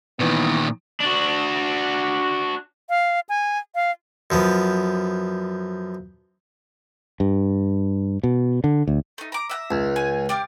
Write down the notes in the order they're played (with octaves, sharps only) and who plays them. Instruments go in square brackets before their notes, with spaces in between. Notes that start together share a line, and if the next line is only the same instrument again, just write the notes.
[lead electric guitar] A#2 D#3 [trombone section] E3 B3
[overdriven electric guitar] D4 F#4
[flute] F5
G#5
F5
[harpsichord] F#2 F3 B3
[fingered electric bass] G2
B2
D3
D2
[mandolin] A3 D#4
A#5 D6
E5 F#5 A#5
[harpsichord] C#2
[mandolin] G#5
G4 D5 F5